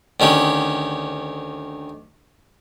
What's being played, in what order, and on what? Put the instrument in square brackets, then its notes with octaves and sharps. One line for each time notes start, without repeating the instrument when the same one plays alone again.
[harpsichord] D2 D#3 C#4 G4